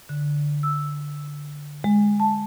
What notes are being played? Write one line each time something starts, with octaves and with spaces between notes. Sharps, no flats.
D3
E6
G#3
A5